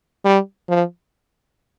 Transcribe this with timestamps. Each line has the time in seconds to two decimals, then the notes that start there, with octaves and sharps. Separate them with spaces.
0.25 G3
0.69 F3